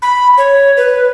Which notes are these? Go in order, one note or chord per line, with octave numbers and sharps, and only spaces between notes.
B5
C#5
B4